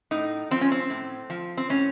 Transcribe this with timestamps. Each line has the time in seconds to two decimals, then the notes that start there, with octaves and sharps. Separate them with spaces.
0.11 A2 D#4
0.51 F3 C4
0.61 C#4
0.72 C4
0.90 A2
1.30 F3
1.57 C4
1.69 A2 C#4